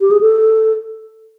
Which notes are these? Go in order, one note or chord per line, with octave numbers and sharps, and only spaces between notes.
G4
G#4
A4